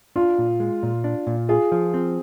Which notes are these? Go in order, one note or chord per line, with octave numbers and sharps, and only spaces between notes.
D4 F4
A#2
G#3
A#2
D4
A#2
F4 G#4
F3
C4